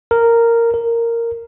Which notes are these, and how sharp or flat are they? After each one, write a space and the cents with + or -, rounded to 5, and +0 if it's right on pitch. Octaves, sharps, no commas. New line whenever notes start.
A#4 -10
A#4 -10